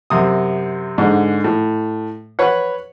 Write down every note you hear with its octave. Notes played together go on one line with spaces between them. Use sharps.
F#2 C3 D#6
G#2 D3
A2
B4 C#5 F#5